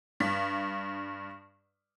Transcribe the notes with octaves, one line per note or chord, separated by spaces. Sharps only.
G2 B6